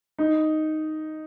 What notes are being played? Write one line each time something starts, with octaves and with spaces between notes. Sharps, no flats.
D#4